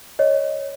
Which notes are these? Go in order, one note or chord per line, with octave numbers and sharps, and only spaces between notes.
C#5 D#5